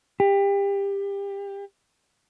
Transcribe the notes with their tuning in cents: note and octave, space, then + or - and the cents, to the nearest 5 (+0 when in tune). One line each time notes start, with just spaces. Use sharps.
G4 +25